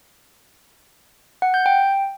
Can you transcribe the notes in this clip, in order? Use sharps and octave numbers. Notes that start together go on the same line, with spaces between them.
F#5
G6
G5